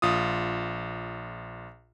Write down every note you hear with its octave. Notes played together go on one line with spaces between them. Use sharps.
A#1 F4 D#6